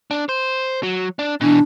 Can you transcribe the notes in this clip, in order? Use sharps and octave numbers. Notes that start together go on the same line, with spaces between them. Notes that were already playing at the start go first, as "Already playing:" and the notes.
D4
C5
F#3
D4
B2 E3 D4